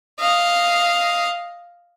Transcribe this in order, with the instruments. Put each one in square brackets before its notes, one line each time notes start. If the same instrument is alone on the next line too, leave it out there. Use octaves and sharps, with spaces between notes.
[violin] D#5 F5